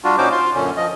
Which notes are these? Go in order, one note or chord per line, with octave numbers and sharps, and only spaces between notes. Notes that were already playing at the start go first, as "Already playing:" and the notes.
G3 D4 F4 F#4
A#2 C#4 D#4 F#4 C5 D6
F4 F5 C6
F#2 A#2 D3 C#4
F3 D#5